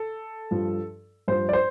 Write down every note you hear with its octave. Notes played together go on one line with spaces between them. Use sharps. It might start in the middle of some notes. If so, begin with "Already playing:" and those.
Already playing: A4
G2 F3
G2 F3 C5
D5
C5